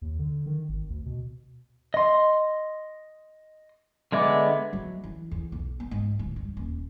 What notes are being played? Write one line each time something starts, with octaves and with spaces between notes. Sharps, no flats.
D#2
D3
D#3
G#1
D2
B2
D#5 C6
D3 G#3 B3 E5 D6
F#3
E3
E2
B1
B3
G#2
D1
G2
D#1